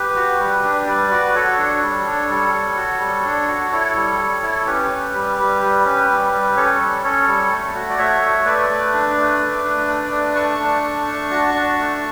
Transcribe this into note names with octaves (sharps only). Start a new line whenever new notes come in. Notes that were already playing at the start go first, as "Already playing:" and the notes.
Already playing: G4 B4
F#4
G3
D4
G3 B4 D5
F#4
F#4 A4 C#5
D4
G3
D4
G3
G3
F#4
G3
D4
F#4
E4 A4 C#5
G3
G3
E4
C#4 G4 B4
C#4
G3
G3
G3
C#4
G3
G3
C#4 A4 C#5
G3
C#4 A4 C#5
G3
A3
F#4
D5
A3 C#5 E5
A3
A3 B4 D5
A3
D4
A3
A3
D4
A3
D4
A3 A5 C#6
D4
A3
D4
F#4
D4
A3